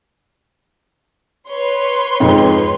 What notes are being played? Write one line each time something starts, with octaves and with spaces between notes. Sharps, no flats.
B4 C#5 C6
F2 G#2